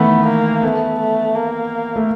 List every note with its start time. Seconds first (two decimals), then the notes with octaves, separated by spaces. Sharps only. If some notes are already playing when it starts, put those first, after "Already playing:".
Already playing: D#3 E3 A3 B3
0.27 A#3
0.63 A3 B3
1.00 A3
1.35 A#3
1.96 A3